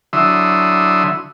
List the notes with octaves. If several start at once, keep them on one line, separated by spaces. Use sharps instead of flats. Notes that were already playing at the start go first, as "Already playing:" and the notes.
D3 F#3 E4 E5 C6 D#6